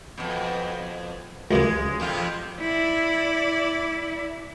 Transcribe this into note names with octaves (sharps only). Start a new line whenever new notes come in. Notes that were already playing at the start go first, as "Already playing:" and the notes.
F2 B2
C#2 F#2 C#3 G#3
F2 C3 F4
E4 D5